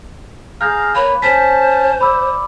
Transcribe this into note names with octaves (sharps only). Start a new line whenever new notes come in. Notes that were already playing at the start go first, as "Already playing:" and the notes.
G#4 F5 A#5 F6 G6 A#6
A#3 B4 C#5 B5
C#4 C5 A5 B6
D5 B5 E6